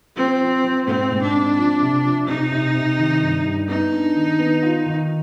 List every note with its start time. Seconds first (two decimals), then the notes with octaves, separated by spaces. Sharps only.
0.16 F3 C4
0.41 F3
0.64 F3
0.87 G#2 C4
1.11 G#2
1.22 D4
1.34 C4
1.58 F3
1.81 C3
2.05 F3
2.28 C3 D#4
2.51 C3
2.74 C3
2.98 D#3
3.22 G2
3.45 G2
3.68 B3 D#4
3.92 D4
4.16 D#3
4.39 B3
4.63 F4
4.86 D#3